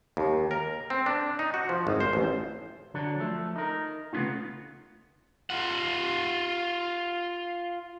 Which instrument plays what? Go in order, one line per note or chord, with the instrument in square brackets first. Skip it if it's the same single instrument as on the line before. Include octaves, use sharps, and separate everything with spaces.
[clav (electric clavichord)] D#2
A#4
C4
D4
D#4
F#4
F3
G#1
C5
A1
[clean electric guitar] D3 F#3 D4
F3 A3
D#4 A#4
C#3 A3 B3 C#4 D#4 F4
[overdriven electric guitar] F4 F#5